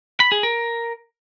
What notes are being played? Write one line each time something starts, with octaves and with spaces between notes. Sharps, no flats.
B5
G#4
A#4